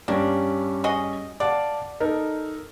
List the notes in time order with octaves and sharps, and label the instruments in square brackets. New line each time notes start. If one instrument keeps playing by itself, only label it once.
[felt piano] G2 G3 C#4 [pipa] A#3 D4
[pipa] F#4 G#4 D#5
[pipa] D5 [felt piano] F5 F#5 A5
[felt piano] D#4 A4 A#4